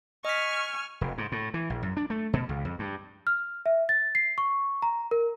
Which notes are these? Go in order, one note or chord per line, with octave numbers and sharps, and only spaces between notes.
D#5 G#5 C#6 F6 B6
F1
G#2
A2
E3
A#1
F#2
D4
A3
B2
C#2
F2
G2
F6
E5
A6
C7
C#6
A#5
A#4